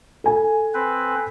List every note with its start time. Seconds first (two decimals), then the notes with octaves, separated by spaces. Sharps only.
0.24 A4 G#5
0.74 C4 B4